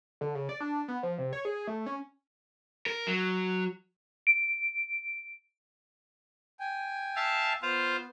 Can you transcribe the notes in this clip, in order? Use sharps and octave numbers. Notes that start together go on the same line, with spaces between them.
D3
C#3
D5
D4
B3
F3
C3
C#5
G#4
A3
C#4
A#4
F#3
D7
G5 G#5
E5 F5 A5
B3 F4 C5 F5